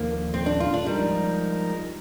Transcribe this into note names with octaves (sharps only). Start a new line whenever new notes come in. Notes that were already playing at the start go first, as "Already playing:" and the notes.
Already playing: D#2 D3 F3 A#3
C4
D4
F4
D4
F3 G3 G#3 D#4 A#4